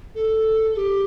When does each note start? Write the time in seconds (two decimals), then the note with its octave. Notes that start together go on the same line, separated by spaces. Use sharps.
0.15 A4
0.73 A4
0.77 G4